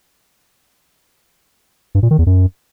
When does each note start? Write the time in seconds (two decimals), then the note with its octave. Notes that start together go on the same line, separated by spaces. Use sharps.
1.95 G2
2.03 A#2
2.11 D#3
2.19 E2
2.27 F#2